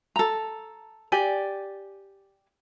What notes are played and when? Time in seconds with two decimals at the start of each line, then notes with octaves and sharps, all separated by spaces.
0.16 A4 A#5
1.12 G4 D5 G#5